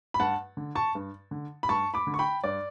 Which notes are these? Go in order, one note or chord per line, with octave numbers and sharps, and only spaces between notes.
B5
G2 F#5 A5
D3
A5 C#6
G2
D3
B5
G2 A5 C#6
B5 D6
D3
C#6
G5 B5
G2 D5